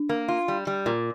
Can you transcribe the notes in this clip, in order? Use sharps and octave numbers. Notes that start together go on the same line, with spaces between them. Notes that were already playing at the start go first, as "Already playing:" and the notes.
Already playing: D4
A#3
F4
G3
G3
A#2